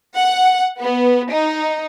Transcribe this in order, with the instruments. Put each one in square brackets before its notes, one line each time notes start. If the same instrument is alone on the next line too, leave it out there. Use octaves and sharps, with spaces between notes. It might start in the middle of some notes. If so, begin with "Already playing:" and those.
[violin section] F#5
B3
D#4